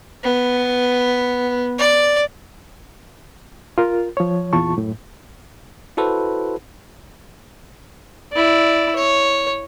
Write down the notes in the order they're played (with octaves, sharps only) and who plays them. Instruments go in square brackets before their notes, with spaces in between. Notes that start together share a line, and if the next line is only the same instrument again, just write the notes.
[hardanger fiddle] B3
D5
[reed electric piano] F4 A#4
F3 C#5
E2 A#2 F4 A5 C#6
F#2 A2
[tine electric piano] E4 F#4 A4 B4 C5
[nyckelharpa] E4 D5
C#5